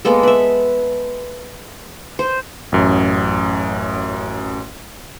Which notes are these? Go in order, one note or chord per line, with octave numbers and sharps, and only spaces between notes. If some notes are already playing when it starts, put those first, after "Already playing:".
G#3 A#3 B3 A4
B4 E5
C5
A1 F#2